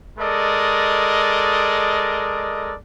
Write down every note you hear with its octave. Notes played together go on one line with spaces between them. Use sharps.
G#3 A4 A#4 D5 D#5